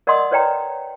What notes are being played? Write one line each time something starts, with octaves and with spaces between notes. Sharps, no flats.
A#4 D5 D#5 F#5 C6 D#6
B4 C#5 D5 G5 A#5